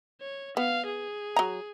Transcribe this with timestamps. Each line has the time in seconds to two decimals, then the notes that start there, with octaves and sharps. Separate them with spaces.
0.21 C#5
0.57 B3 F5
0.86 G#4
1.36 F#3 A#5